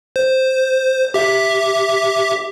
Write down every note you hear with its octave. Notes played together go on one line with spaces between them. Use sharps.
C5
G4 E5